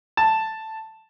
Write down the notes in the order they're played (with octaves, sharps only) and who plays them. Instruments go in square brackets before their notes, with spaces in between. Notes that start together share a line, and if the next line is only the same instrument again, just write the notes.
[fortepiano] A5